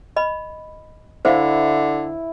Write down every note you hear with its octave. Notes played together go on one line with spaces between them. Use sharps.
D#5 B5
D3 E4 C5 F5